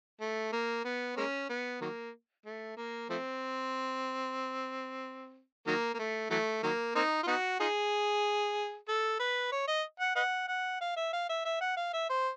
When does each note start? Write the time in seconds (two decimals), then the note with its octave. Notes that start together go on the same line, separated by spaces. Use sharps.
0.21 A3
0.53 A#3
0.85 B3
1.17 G#3 A#3 C#4
1.49 B3
1.81 D#3 F#3 A#3
2.46 A3
2.77 A#3
3.10 F3 A3 C4
5.67 D#3 F#3 A#3
5.94 A#3
5.99 A3
6.30 E3 F#3 A3
6.63 D#3 F#3 A#3
6.95 A#3 C4 D#4
7.23 F4
7.27 B3 D#4 F#4
7.60 D#4 F4 G#4
8.88 A4
9.19 B4
9.52 C#5
9.68 D#5
10.00 F#5
10.16 B4 D#5 F#5
10.48 F#5
10.81 F5
10.96 E5
11.13 F5
11.29 E5
11.45 E5
11.61 F#5
11.77 F5
11.93 E5
12.10 C5